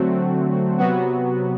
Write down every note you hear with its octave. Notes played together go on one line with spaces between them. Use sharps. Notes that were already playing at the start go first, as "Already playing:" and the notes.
Already playing: D3 F#3 A3 C4 F#4
C3 F#3 B3 F#4